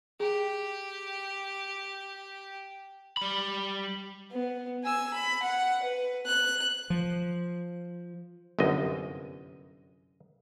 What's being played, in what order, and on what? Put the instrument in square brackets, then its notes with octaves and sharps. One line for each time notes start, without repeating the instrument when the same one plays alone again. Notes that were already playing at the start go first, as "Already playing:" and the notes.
[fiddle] G4 [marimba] G#4
[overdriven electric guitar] G3 B5
[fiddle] B3
G#5 E6
B5
F#5
B4
F#6
[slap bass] F3
[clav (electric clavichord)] G1 C2 F#2 D#5